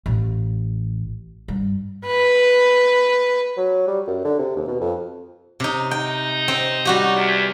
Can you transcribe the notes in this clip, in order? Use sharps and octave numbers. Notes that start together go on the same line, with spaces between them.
A1
G2
B4
F#3
G3
F#2
D3
C3
D#2
B2
F2
C3 D#4
D#4 G5
C4
G3 F#4 G4
E2